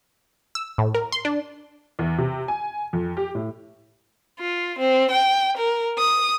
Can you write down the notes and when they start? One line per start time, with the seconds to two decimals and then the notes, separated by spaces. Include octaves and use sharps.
0.55 E6
0.78 A2
0.95 A#4
1.12 C6
1.25 D4
1.99 E2
2.18 C3
2.48 G#5
2.93 F2
3.17 G4
3.35 A2
4.39 F4
4.79 C4
5.11 G5
5.57 A#4
5.99 D#6